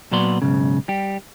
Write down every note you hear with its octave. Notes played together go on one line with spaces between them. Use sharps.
A#2 F#3 B3 D5 C6
B1 G#2 C#3
G3 G4